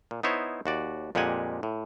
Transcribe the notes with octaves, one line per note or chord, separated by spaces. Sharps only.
A#2
B3 D#4 E4 C5 C#5
D#2 F#4 D5
F2 A#2 G#3 G4 F#5 G#5
A2